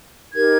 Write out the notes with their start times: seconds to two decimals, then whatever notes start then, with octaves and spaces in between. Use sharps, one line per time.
0.34 D#4 G4 A#4 G#6